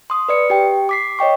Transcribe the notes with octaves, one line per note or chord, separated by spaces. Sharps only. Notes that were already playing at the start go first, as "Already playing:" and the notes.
C6 D#6
B4 D5 C#7
G4 G5
D6 B6 C7
C#5 D#5 G5 C#6